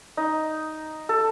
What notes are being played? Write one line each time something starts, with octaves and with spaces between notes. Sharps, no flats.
D#4
A4